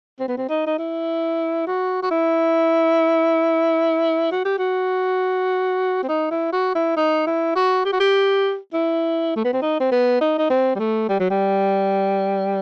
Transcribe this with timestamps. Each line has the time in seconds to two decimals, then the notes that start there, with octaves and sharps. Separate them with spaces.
0.20 C4
0.29 B3
0.37 C4
0.49 D#4
0.67 D#4
0.79 E4
1.67 F#4
2.02 F#4
2.11 E4
4.32 F#4
4.45 G4
4.59 F#4
6.04 C4
6.09 D#4
6.31 E4
6.53 F#4
6.75 E4
6.97 D#4
7.27 E4
7.56 F#4
7.85 G4
7.93 F#4
8.00 G4
8.74 E4
9.36 A3
9.45 B3
9.53 C4
9.62 D#4
9.80 C4
9.92 B3
10.21 D#4
10.38 D#4
10.50 C4
10.76 G3
10.79 A3
11.09 G3
11.20 F#3
11.31 G3